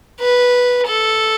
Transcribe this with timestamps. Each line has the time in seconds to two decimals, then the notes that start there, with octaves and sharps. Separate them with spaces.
0.20 B4
0.88 A4